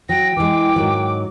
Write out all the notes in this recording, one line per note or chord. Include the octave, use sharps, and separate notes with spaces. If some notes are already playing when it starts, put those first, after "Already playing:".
F#3 G5 A#6
E3 G#3 D6
G#2 D#3 F#3